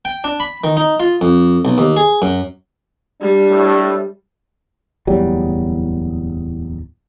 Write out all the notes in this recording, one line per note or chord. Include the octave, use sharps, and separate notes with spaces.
G5
D4
B5
D#3
D#4
F4
F2
B1
D#2
G#4
F#2
G3 D4
A2
D1 E2 F#3 G3